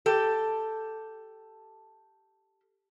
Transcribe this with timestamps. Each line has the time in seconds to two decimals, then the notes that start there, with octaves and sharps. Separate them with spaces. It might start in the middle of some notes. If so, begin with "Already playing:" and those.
0.06 G4 A4